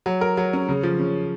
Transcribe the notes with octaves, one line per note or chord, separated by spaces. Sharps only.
F#3
A#4
F#3
C#4
C#3
F3
C#3